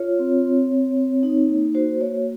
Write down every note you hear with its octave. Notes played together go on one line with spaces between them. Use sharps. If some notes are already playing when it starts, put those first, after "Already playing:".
Already playing: F4 C#5
C4
C4
C4
C4
D#4
A#3
F#4 C5
A#3 C#5